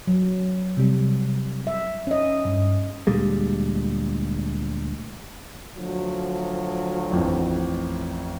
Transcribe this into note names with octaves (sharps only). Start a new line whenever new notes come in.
F#3
C3 G3
E5
C#4 D#5
G2
D2 A#2 G3 G#3
D2 F3 F#3
A1 F2